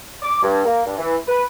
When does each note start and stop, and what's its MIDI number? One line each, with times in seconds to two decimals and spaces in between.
0.23 0.42 86
0.43 0.64 43
0.66 0.85 58
0.86 0.96 43
0.98 1.16 52
1.27 1.44 71